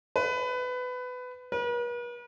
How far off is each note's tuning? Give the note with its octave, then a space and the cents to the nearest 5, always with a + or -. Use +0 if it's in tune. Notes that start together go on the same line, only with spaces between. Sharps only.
B4 +20
B4 -45